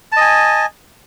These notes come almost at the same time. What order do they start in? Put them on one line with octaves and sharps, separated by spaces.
A5 D#5 G#5